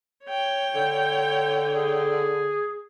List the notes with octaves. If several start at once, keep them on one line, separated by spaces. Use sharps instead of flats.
C#5 G5
D3
G#4